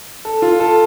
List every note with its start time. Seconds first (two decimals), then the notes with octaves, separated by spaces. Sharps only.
0.25 A4
0.42 F4
0.60 A4